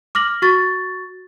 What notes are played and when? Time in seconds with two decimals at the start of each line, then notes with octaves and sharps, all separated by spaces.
0.15 D6 F6 A#6 F#7
0.42 F#4 C#6 A6